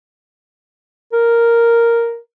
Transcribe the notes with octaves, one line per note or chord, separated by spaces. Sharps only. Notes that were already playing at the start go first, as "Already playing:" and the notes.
A#4